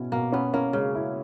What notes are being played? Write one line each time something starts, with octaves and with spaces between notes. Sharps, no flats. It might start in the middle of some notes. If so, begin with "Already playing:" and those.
Already playing: B2 C#4 E4
B2 A#3
B3 C#4
A#3 C#4
C#3 G#3
E4